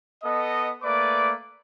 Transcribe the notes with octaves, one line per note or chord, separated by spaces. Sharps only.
B3 A4 D#5
A3 A#3 B4 D5 D6